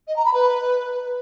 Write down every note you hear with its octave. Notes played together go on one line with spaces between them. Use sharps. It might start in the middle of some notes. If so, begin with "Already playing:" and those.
D#5
A#5
B5
B4